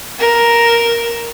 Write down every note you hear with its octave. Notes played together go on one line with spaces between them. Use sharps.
A#4 E7